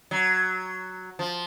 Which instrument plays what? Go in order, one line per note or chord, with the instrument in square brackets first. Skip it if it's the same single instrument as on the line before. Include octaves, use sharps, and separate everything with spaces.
[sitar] F#3
F3